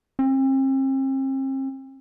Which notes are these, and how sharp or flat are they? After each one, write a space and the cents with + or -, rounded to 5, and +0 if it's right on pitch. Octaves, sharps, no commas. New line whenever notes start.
C4 +40